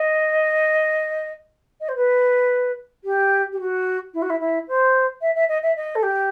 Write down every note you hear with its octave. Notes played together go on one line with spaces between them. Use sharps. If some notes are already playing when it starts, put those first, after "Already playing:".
Already playing: D#5
D#5
C5
B4
G4
G4
F#4
E4
F#4
E4
E4
C5
E5
E5
D#5
E5
D#5
A4
G4